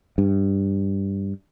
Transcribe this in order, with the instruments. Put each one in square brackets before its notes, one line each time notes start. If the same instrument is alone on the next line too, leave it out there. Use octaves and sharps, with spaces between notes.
[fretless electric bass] G2